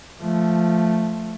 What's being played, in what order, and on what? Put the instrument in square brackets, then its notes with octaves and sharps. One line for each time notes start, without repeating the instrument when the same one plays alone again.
[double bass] F3 A3